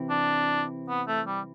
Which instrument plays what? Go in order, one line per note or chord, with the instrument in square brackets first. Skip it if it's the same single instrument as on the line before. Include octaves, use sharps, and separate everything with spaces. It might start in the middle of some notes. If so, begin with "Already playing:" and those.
Already playing: [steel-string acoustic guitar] C3 E3 C4 E4
[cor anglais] D4
B3
A3
G3